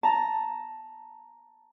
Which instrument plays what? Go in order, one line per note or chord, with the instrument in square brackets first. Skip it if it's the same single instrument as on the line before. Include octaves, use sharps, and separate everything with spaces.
[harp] A5 A#5